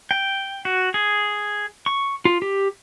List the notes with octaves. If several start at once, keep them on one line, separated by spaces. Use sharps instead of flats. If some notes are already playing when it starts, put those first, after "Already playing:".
G5
F#4
G#4
C#6
F4
G4